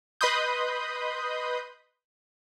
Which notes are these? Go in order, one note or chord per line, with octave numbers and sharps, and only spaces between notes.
B4 D#5 B5 C6 D#6 G6